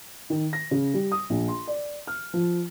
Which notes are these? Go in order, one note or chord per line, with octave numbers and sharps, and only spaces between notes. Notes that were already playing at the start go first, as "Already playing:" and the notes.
D#3
A#6
C#3
G3
D#6
A#1
C6
D5
F6
F3